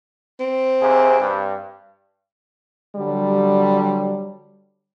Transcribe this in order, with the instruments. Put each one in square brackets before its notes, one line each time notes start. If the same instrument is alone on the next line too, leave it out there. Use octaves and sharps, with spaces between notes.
[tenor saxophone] C4
[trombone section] D#2 C3 G#4
G2
[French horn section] D3 F#3 G3